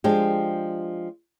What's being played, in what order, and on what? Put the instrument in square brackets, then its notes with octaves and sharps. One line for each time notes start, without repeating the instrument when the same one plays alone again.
[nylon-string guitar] F3 G#3 D4 G4